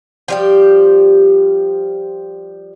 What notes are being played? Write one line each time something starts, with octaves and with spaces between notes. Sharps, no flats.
F3 G3 G4